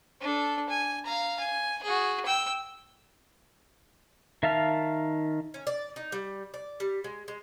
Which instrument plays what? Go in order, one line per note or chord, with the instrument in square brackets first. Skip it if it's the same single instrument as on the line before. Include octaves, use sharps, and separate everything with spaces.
[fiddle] D4 A4
G#5
F5 A#5
G#5
F#4 G#4
G5 E6
[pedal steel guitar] D#3 E5 F5 A5 F6
[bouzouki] C#4
D5
D#4
G3
D5
G3
G#3
G#3